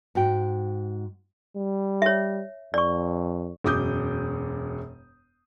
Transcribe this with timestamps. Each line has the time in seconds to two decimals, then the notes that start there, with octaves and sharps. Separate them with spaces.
0.15 G#2 F#4 G5
1.56 G3
2.02 C#5 E5
2.74 F2 D5 C#6
3.64 E1 F#2 D6 D#6 G6